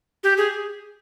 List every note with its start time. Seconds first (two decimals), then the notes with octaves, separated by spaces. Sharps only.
0.23 G4
0.37 G#4